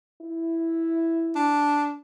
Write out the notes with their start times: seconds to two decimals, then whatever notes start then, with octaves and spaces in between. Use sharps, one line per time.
0.22 E4
1.36 D4